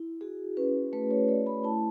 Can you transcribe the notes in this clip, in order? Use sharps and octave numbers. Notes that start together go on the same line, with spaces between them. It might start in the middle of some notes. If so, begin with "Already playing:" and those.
Already playing: E4
F#4 G#4
C#4 B4
A3 B4
C#5
A3 D5
B5
E4 A5